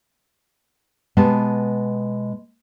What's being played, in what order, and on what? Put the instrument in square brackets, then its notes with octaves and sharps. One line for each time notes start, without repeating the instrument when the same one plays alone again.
[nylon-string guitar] B2 G#3 B3 G4 A5